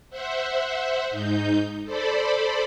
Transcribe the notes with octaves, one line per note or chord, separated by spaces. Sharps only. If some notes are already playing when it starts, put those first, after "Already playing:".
C5 E5 F#5
G#2 D#4 G6
A4 C5 D5 B5